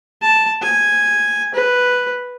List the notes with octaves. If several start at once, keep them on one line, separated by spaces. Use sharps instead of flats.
A5
G#5
B4